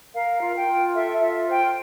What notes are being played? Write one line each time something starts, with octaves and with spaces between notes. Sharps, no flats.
A#4 F5
F4
G5
F4
A4 E5
F4 E5
C5 G5